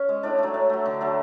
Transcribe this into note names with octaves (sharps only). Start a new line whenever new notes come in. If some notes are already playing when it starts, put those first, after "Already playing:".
Already playing: C#4
G#3
A2 D4
F#3 A3
A2
F#3 A3
D3
F#3 A3